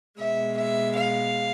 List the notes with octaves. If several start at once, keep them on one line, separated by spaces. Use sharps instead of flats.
B2 G#3 E5
E5
F5